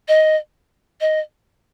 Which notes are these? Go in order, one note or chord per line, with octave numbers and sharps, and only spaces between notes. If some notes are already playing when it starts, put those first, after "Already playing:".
D#5
D#5